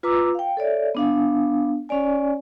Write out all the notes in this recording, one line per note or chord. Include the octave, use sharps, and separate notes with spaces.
F4 B4 A#5 D6 E6
F5 G5
A4 C#5 D5 E5
B3 D4 F5
C#4 C#5 D5 G#5